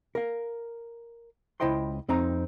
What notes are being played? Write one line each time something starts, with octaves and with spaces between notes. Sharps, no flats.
A#4 F5
C#2 E4 C5 D#5 G5 C6
F2 C4 D#4 A#5